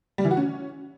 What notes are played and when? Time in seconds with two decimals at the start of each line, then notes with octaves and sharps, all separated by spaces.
0.18 G3
0.25 E3
0.31 F#4
0.37 C#4